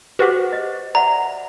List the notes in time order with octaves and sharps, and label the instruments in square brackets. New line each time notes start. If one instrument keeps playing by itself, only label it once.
[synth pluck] F#4 G4 [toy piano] B4 C5 F#5
[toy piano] D#5
[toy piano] D5 E5 F#5 [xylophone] A#5